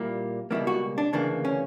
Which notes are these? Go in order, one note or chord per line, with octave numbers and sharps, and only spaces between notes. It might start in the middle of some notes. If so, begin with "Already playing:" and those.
Already playing: A#2 G3 A#3 E4
C#2 B2 G3 A#3 E4
F#4
D4
D2 C#3 E3 A#3 D4
C#4